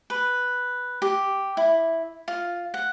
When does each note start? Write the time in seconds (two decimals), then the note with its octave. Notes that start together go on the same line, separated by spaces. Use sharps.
0.10 B4
1.02 G4
1.57 E4
2.28 F4
2.74 F#5